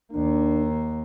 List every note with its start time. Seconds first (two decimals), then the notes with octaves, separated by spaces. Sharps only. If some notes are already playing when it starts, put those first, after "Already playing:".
0.13 D#2 A#3 D4